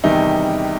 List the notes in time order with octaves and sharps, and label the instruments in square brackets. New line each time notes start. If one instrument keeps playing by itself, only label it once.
[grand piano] E2 C3 D#3 G3 D#4